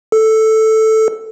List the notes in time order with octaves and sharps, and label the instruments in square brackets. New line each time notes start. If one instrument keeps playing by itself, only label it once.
[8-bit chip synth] A4